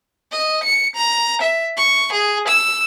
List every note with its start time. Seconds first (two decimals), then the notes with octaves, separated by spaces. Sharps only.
0.32 D#5
0.63 C#7
0.95 A#5
1.41 E5
1.77 C#6
2.12 G#4
2.47 E6